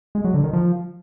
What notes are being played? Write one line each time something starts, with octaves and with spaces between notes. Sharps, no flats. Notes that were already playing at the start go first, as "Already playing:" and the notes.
G#3
F#3
D3
D#3
F3